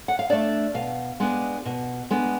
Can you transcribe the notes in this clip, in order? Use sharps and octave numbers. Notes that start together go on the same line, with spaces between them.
F#5
F5
A3 D4 D5
B2 F5
G#3 B3 D4
B2
G#3 B3 D4